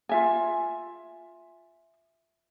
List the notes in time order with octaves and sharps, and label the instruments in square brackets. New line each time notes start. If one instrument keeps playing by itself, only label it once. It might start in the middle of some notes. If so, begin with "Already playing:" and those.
[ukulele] F4 E5 G#5